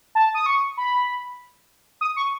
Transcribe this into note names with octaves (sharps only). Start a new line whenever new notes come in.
A5
D#6
C#6
B5
D#6
C#6